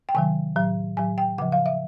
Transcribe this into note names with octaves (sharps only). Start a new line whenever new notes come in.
G5
C3 D#3 F#3 G#5
A2 F#3
A2 F#3 G#5
G5
C#3 F3 F#5
F5
E5